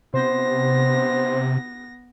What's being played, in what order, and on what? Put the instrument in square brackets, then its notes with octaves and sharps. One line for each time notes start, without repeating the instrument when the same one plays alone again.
[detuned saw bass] C3 [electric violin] B3 A#6 [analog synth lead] C5